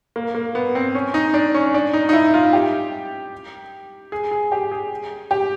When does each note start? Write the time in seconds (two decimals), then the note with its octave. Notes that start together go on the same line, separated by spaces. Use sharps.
0.16 A#3
0.35 A#3
0.55 B3
0.75 C4
0.95 C#4
1.14 D#4
1.34 D4
1.54 C#4
1.74 D4
1.93 D#4
2.09 D#4
2.13 E4
2.34 F4
2.53 G4
4.12 G#4
4.31 G#4
4.52 G4
4.72 G#4
5.31 G4